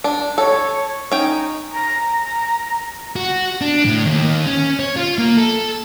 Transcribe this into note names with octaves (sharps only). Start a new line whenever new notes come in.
D4
A4 C#5
C#4 D#4 G5
A#5
F#4
D4
A2
D#2
C#4
C#5
F4
A#3
A4